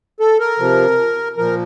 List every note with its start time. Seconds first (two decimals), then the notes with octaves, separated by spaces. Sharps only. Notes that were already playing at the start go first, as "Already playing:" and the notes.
0.20 A4
0.40 A#4
0.59 C3 F3
1.37 A#2 F3 A#4